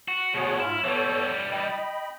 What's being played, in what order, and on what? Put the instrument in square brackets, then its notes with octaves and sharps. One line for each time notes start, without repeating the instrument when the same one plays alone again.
[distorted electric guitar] F#4
[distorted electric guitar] D2 B2 [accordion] F#4 G#4 C#5
[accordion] G#2 F4 F6 [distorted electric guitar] E4
[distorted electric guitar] E3 G3 [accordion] B3 A4 C#5
[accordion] D#5 G5 B5